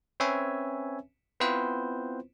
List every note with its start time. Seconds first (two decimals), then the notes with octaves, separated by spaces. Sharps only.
0.20 C4 C#4 B4 C#5 E5 G#5
1.40 B3 C4 E4 F4 B4 C5